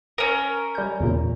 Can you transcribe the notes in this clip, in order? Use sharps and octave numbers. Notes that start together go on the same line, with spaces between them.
C#4 A#4 D#7
G3 G6
E2 A#2